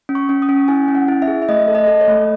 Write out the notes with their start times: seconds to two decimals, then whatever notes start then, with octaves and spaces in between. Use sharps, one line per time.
0.09 C#4
0.15 C#6
0.29 C#4
0.42 D#6
0.49 C#4
0.68 E4 G#5
0.88 C#4
0.95 F#5
1.08 E4
1.22 E5
1.28 G#4
1.42 E5
1.49 A3 D#5
1.68 A4
1.75 D#5
1.88 A4
2.01 C#5
2.07 A3